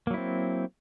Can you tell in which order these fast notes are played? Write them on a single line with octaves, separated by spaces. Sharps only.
A#3 F#3 E4 C4